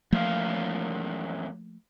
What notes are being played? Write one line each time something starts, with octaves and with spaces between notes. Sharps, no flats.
F#2 E3 F3 A3 A#3 F5